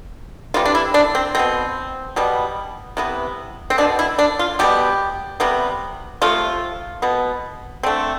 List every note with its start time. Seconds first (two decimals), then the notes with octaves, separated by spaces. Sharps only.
0.54 C3 E3 G3 F4
0.65 D4
0.75 E4
0.94 D4
1.15 C4
1.35 B2 B3 C4
2.16 B2 G3 B3
2.97 C3 E3 B3
3.70 C4
3.78 B2 B3 D4
3.99 E4
4.18 D4
4.39 F4
4.59 B2 G3 B3 G4
5.40 C3 G3 B3
6.21 C3 F3 A3 F4
7.02 B2 B3
7.83 D3 A3 C4